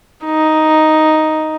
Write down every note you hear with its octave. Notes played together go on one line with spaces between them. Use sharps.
D#4